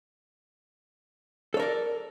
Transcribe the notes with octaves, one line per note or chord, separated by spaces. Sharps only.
A4 A#4 C#5 D5